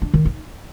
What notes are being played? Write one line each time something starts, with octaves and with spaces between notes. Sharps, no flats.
D4
D#3
D#4